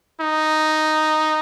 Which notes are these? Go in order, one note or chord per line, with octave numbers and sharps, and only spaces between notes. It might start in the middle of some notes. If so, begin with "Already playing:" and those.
D#4